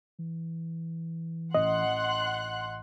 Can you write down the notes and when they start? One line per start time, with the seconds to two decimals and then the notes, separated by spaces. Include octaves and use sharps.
0.19 E3
1.55 A1 D#5 F#5 C6 F#6